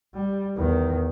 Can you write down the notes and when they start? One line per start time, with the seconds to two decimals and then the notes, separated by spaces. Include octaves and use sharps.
0.14 G3
0.56 E2 D#3